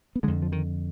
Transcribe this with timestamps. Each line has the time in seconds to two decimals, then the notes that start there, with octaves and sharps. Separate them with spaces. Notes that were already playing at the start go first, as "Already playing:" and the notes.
0.16 B3
0.23 D3 G#3
0.28 F2
0.42 F3
0.52 D#3